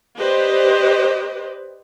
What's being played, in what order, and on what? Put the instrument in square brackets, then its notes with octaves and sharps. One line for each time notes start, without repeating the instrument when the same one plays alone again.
[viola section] G4 B4 C5 D5 D#5